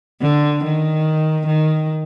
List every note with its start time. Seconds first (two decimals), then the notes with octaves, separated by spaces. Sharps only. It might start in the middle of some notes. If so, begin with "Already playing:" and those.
0.22 D3
0.64 D#3
1.46 D#3